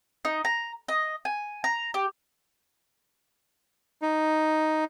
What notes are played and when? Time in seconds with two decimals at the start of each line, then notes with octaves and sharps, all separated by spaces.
0.25 D#4
0.45 A#5
0.88 D#5
1.25 G#5
1.64 A#5
1.94 G4
4.02 D#4